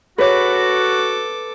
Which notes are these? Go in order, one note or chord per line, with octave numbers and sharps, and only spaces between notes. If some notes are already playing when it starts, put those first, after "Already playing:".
F#4 G#4 A4 B4 C#5 D6